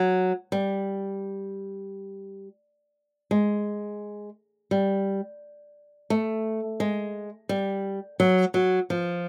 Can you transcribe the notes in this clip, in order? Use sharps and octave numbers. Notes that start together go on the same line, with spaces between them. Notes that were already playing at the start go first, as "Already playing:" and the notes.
Already playing: F#3
G3
G#3
G3
A3
G#3
G3
F#3
F#3
F3